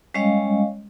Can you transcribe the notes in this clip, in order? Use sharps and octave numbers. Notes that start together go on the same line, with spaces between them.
G3 G#3 C#4 C#5 D#5 F5